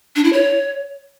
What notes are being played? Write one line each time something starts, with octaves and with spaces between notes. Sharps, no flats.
D4
E4
C#5